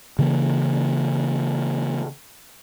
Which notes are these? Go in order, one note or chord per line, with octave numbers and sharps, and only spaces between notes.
C#3 E3 A#3